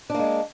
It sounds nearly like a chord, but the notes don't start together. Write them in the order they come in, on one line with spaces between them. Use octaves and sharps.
D4 A#3 G#3